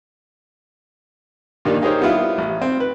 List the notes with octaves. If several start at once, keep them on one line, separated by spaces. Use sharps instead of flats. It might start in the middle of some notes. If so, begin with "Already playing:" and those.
G2 A#2 D#3 G3 A#3 D#4
D#4 G4 G#4 A#4 C5 C#5
G3 B3 E4 F4 E5 F5
A1
C4
B4